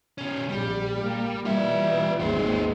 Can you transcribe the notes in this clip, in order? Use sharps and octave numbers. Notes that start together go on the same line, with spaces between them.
B2 C#4
A#1 G3
A#3
B2 E3 G3 F4 E5
G#1 D#2 G#3 B3 C5